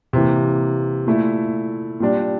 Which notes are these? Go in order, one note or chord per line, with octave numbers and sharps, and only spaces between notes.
C3 E3 A#3
A#2 A3 E4
A#2 G3 D4